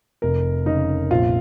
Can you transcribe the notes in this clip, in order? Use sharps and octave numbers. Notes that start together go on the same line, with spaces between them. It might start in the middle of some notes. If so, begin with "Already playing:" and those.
F1 A#4
C#3 D#4
A#1 F4